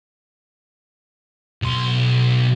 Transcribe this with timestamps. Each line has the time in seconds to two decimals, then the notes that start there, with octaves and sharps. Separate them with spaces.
1.62 B1 C6